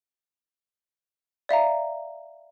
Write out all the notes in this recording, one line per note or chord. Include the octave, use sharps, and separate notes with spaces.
D5 E5 F5 A#5